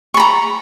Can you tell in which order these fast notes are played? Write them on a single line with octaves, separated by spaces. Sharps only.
C#6 B5 A#5